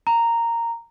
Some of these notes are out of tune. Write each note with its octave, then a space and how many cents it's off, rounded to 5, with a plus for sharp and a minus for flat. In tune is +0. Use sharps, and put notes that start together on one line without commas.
A#5 -10